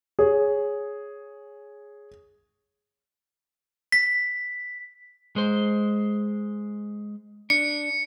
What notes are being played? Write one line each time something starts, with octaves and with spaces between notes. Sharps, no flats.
G#4 C#5
B6
G#3 C5
D4 C#7